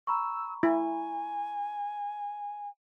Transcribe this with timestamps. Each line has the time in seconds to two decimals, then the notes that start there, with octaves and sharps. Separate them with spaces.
0.07 A#5 B5 C#6 E6
0.63 E4 G#5